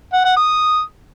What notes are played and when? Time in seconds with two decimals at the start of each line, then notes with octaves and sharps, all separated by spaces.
0.13 F#5
0.25 F#5
0.36 D#6